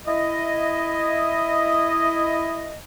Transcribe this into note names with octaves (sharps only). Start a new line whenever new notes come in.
E4 D#5